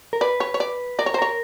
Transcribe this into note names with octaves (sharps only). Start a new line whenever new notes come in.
A#4
B4 D5
C#5
C#5
D5
A#4 D5
C#5
C5
A#4 C#5